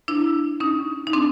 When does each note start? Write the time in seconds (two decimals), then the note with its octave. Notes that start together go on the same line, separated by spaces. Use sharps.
0.08 D4 E4
0.60 C#4 D#4
1.07 D#4
1.13 C4 D4